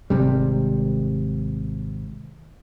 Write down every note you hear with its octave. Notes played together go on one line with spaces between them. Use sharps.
G#1 C3 G3